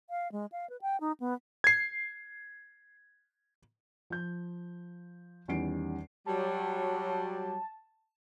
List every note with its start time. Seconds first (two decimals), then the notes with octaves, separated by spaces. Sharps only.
0.10 F5
0.32 G#3
0.52 F5
0.70 B4
0.82 G5
1.00 D#4
1.20 B3
1.64 G#6 C7
4.10 F3 G6
5.48 E2 D#3 G3 C#4 C7 D7
6.26 F#3 G3 A5